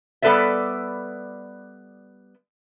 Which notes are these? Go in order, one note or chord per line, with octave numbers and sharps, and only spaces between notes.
G3 B3 A4 B4 D5 E5